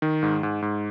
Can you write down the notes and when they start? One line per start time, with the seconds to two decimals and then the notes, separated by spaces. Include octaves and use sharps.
0.02 D#3
0.23 G#2
0.43 G#2
0.62 G#2